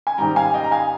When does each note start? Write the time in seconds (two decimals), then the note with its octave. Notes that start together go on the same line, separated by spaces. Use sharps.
0.07 G#5
0.18 G#2 D#3 G3 G5 A#5
0.36 F5 G#5
0.54 D#5 G5
0.64 A#5
0.71 F5 G#5